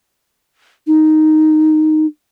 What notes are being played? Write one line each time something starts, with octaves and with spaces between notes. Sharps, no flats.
D#4